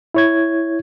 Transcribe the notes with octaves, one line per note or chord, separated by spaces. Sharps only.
E4 C#5 G#6